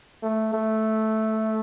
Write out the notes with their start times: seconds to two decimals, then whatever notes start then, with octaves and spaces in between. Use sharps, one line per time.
0.23 A3
0.54 A3